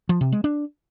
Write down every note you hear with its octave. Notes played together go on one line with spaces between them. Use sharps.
F3
C3
G#3
D4